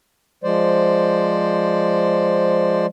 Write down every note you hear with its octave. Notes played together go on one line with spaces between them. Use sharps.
F3 G#3 C5 D5